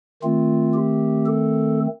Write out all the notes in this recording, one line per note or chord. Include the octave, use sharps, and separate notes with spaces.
D#3 A3 C4 F4
G4
A4